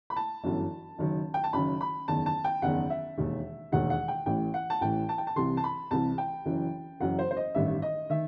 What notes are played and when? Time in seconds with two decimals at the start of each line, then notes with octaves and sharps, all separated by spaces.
0.10 B5
0.16 A5
0.43 G1 F#2 E3
0.98 F#1 F#2 D#3
1.34 G5
1.44 A5
1.53 F#1 F#2 D#3 B5
1.81 B5
2.08 F#1 E2 D#3 A5
2.26 A5
2.44 G5
2.62 F#1 E2 D#3 F#5
2.90 E5
3.17 E1 D#2 D#3
3.72 E1 D#2 D#3 F#5
3.90 F#5
4.08 G5
4.26 A1 A2 E3 G5
4.54 F#5
4.70 A5
4.81 A1 A2 E3 G5
5.09 A5
5.18 G5
5.27 A5
5.36 C2 C3 E3 C6
5.57 A5
5.64 B5
5.91 C2 C3 E3 A5
6.18 G5
6.45 F#1 F#2 E3
7.00 F#1 F#2 E3 F#5
7.19 C5
7.31 C5
7.37 D#5
7.55 A1 G2 D#3 E5
7.82 D#5
8.10 D#3 E5